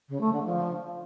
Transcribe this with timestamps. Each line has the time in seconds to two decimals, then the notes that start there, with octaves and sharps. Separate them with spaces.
0.09 C#3
0.21 A3
0.33 D3
0.45 F3